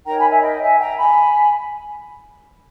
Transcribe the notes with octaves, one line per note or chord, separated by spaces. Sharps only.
D#4 A#4 C#5 G5 A#5
G#5 B5
E5 G#5
D#5 G5
E5 G#5
G5 A#5
G#5 B5